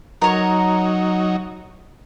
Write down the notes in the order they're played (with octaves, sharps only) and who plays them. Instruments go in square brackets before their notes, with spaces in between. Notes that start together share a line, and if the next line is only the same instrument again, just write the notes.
[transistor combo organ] F#3 D#4 [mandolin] A#4 C#5